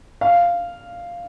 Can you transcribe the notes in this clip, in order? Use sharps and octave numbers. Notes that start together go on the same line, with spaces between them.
F5